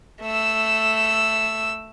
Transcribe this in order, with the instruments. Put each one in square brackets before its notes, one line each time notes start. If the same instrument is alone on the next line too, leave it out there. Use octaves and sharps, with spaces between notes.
[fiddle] A3 E6